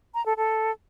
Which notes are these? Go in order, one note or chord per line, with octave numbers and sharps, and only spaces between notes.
A#5
A4
A4